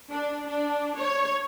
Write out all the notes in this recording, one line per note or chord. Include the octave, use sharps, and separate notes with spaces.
D4
D4
C#5